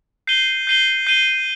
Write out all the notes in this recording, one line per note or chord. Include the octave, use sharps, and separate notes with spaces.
G6 C7 D#7 G7
G6 C7 D#7 G7
G6 C7 D#7 G7